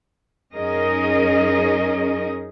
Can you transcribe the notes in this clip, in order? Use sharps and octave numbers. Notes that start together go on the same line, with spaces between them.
F#2 C#4 D#4 G#4 A#4 D#5